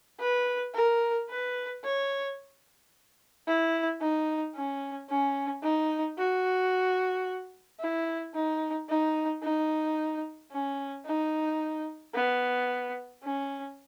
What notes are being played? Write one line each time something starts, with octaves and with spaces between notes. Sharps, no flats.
B4
A#4
B4
C#5
E4
D#4
C#4
C#4
D#4
F#4
E4
D#4
D#4
D#4
C#4
D#4
B3
C#4